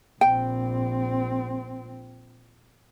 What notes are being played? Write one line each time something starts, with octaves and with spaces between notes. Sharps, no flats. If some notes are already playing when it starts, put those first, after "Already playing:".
A#1 C4 G5